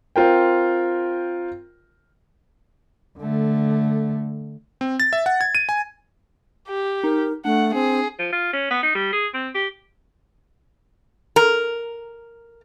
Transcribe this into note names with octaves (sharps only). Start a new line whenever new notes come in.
C4 F4 A#4 G5
D3 A3
C4
A6
E5
F#5
G#6
D#7
G#5
G4
D#4 A#4
A3 D4 F#5
C4 G#4
F3
F4
C#4
B3
D#4
G3
G#4
C4
G4
A#4